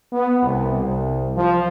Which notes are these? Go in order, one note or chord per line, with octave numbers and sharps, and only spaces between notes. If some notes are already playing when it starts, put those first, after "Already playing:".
B3
C2
C2
F3